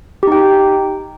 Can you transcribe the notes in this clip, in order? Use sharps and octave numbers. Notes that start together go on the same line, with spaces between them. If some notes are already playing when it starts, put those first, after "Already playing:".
D#4 G4 G5